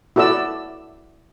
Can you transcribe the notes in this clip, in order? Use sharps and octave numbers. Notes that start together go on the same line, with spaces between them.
E4 F#4 A4 D5 E6